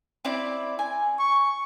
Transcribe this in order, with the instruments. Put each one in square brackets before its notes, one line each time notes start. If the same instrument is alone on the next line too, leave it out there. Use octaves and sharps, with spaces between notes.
[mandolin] C4 E4 D5
G#5
[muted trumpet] C#6